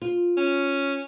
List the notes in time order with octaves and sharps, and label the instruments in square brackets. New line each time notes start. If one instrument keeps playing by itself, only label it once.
[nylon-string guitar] F4
[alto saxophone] C#4